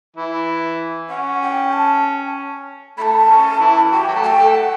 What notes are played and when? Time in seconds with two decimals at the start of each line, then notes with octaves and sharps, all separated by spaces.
0.17 E3 E4
1.10 C#4 F#5
1.42 G5
1.73 A5
2.98 A3 A5 B5
3.29 C#4
3.60 E3 E4
3.92 F#4 G5
4.00 G4
4.07 F#3 F#4
4.15 A3 A4
4.23 A5
4.26 G5
4.38 A3 A4
4.54 F#5